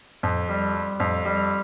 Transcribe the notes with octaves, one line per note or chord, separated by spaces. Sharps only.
F2
G3
G3
F2
G3